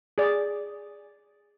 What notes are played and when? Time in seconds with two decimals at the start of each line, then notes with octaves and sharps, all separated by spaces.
0.18 G#4 D5